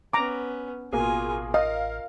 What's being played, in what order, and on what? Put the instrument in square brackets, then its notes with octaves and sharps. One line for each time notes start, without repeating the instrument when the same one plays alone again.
[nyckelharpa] B3 C#4 [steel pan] A#5 D6
[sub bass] A1 [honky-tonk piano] B2 A#3 G#4 [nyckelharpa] F4 G#5
[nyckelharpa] A#4 [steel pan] D#5 [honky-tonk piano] F5